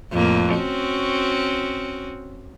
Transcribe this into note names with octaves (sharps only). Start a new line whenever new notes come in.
F2 A2 A#3
C4 C#4 F#4